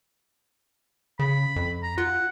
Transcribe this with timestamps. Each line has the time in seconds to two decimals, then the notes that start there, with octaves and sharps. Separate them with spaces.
1.19 C#3 B5
1.56 F2
1.83 A#5
1.98 F4 F#5